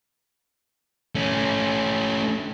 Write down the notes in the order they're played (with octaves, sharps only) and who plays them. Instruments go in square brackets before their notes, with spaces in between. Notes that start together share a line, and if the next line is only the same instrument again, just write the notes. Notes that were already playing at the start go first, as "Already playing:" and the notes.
[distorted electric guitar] A3 C#4